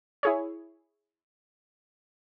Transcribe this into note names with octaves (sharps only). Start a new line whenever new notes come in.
E4 G#4 C#5